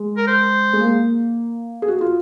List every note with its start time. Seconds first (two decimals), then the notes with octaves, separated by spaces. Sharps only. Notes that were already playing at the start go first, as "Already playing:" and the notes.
Already playing: G#3
0.17 A#4
0.27 C5
0.73 G#3
0.80 A#3
1.82 G#4
1.88 F#4
2.01 F4